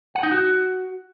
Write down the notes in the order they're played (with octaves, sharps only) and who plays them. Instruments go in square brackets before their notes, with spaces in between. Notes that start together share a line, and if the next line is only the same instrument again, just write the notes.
[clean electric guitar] F#5
D#4
F#4